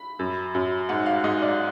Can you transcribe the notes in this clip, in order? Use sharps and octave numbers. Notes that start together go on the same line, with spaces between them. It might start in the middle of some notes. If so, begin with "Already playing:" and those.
Already playing: B5
F#2
F#2
G#2 F#5
F5
G#2 D#5
D5